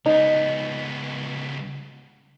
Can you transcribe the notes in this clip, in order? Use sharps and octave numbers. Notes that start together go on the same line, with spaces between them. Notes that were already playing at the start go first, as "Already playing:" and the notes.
C#2 B3 D#4